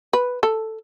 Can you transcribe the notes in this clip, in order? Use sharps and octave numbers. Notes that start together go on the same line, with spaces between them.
B4
A4